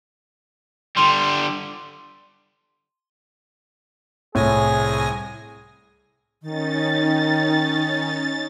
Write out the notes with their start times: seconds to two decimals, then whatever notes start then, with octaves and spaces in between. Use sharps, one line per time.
0.97 D3 G3 C6 D#7 F7
4.35 C2 A2 G#4 G#5 A#6
6.42 D#3 C#4 D#4 A6